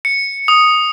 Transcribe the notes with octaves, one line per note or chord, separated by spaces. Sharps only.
C#7
D#6